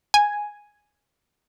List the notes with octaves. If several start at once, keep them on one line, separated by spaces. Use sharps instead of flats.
G#5